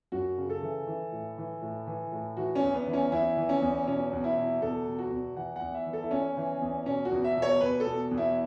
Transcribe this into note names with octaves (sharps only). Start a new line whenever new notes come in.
F#2 F#4
C#3
A4
E3
E3
A2
E3
A2
E3
A2
E3 F#4
C#4
E2
B3
E3
C#4
E2 E4
E3
C#4
E2
B2 C#4
E2
E4
B2
E2 A4
B2
F#4
E2
E3 F#5
F#5
E2
E5
E3
A4
E4
E2 C#4
E3
E2
B2 C#4
F#4
E2
E5
B2
C#5
E2 B4
A4
B2
E2
E4